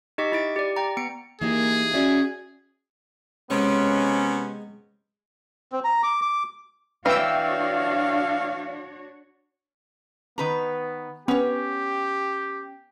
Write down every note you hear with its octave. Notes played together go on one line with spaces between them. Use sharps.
D#4 G4 D#5 C#6 B6
E4 A6 D7
G4 D5
G5 A#5
B3 A#5 C#7 D7
E3 A#3 D#4 G4 G#4
C#4 F#4 D5 E5
C3 G#3 B3 C#4
C4
A#5
D6
D6
E3 D4 F#4 C#5 E5 F5 G5 E6
D#3 B3 B4 A#5
B3 C#4 G4 C#5